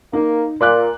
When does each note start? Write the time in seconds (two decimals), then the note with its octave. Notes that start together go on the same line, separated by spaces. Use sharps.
0.13 A#3 D#4
0.61 A#2 C6 D6 F#6